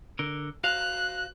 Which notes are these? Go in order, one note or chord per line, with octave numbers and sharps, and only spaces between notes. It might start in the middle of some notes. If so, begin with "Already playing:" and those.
D3 A#4
F#4 C5 F5 F#6